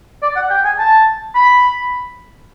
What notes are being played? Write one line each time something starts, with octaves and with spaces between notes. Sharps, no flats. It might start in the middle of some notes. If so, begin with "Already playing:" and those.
D5
F#5
G5
G#5
A5
B5